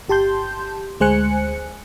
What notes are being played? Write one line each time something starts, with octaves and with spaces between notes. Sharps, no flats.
G1 G4 A5 C6 G6
D2 G#3 C5 G#5 F#6 C#7